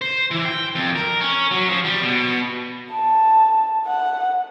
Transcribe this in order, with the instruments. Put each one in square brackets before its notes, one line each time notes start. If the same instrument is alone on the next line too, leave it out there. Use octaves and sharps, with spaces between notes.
[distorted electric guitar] C5
E3
G5
F2
A#4
C#4
F#3
F3
G3
B2
[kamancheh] A5
F#5